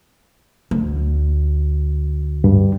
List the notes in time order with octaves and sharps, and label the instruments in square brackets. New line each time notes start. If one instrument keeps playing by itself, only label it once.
[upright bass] D2
[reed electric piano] G2